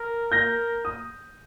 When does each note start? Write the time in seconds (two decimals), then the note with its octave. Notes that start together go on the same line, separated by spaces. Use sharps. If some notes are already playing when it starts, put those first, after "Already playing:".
Already playing: A#4
0.32 A#4 G6 A#6
0.85 D#6